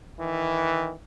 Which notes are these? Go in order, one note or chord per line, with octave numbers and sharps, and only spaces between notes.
D#3 E3